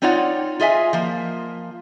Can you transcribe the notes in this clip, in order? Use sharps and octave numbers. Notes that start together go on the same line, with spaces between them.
C4 D#4 F4 C#5 D5 F#5
F4 G#4 D#5 E5 G#5
F3 A#3